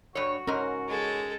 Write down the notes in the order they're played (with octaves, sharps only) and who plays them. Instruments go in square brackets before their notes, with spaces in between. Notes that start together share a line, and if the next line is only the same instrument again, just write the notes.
[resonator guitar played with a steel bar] G2 C#5 [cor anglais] F#4
[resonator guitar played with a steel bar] G#2 A#4 [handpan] C#4
[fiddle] G#3 A4